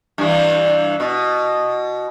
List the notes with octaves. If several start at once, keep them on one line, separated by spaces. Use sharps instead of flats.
G2 E3
B2